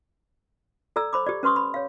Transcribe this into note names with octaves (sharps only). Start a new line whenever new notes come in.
A4 D5 A#5 E6
C5 B5 D6
G4 D5
C#4 B4 C6 C#6 D#6
B5
C#5 F5